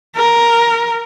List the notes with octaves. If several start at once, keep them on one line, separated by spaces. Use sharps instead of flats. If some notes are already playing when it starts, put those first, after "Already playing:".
A#4